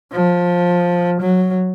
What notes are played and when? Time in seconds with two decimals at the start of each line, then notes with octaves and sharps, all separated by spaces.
0.12 F3
1.21 F#3